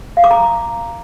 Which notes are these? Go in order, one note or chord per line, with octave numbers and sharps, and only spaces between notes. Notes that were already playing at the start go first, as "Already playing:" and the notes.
F5
D6
A#5